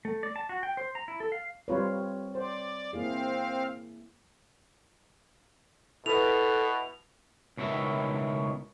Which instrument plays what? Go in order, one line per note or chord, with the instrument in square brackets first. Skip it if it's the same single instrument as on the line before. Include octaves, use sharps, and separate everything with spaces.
[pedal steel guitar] A3
D5
A5
F#4
G5
C5
A#5
E4
A4
F5
[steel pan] G3 F4 B4 [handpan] C4 C#5
[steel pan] C5 [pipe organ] D5
[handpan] A#3 E4 G#4 [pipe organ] C4 F5
[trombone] B2 [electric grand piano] E4 B4 [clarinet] A4 [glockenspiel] F7
[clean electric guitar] C#2 B2 D#3 E4 E5